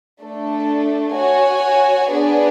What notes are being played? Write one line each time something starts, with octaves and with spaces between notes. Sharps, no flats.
A3 D4 A4
F#4 C#5 G#5
B3 D4 G#4 B4 D5